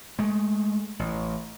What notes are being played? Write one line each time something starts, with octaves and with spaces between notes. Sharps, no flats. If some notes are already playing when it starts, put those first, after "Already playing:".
G#3 A3
A1